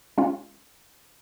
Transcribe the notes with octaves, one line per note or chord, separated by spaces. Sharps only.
G#3 C#4 F4